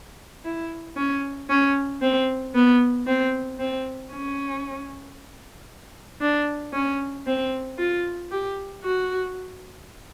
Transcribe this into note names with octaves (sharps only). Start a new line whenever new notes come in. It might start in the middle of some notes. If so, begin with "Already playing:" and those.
E4
C#4
C#4
C4
B3
C4
C4
C#4
D4
C#4
C4
F4
G4
F#4